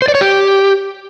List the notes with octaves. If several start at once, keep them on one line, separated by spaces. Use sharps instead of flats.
C5
D5
C#5
G4